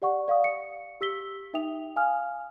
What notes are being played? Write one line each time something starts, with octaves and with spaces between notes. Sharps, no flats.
G4 D5 F#5 C#6
D5 F5 C#6 D#6
C#7
G4 E6 B6 G7
D#4 E5 G5 D#6 F7
F5 G#5 D#6 F6